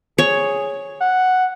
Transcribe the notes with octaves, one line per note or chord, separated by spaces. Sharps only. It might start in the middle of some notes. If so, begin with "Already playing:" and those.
G#4 C#5
F#5